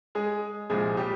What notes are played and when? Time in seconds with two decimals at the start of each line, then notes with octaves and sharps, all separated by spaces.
0.15 G#3 G#4
0.70 C2 A#2 F3 G#3 G#4
0.97 G3 G4